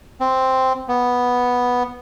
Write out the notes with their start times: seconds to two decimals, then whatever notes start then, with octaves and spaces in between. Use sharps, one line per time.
0.20 C4
0.88 B3